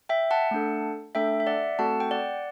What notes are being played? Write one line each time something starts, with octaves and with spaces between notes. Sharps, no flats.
E5 G5
F#5 A5
A3 D4 A4
A3 D4 A4 E5 G5
E5
D5 F#5
A3 C4 F#4 A4 F#5 A5
G5
D5 F#5